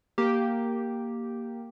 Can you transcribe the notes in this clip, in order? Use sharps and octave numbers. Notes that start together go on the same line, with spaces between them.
A#3 G4